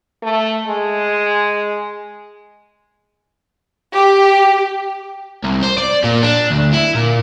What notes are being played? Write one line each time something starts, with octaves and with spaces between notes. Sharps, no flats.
A3
G#3
G4
C2
C5
D5
A#2
D4
D2
E4
A#2